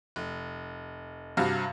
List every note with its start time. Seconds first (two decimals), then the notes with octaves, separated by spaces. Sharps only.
0.16 F1
1.37 G2 C3 F#4 F5 A#6